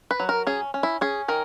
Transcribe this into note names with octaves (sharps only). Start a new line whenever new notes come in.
B4
F#3
A#4
C#4 G#4
C#4
E4
C#4 G#4
D#3 A#4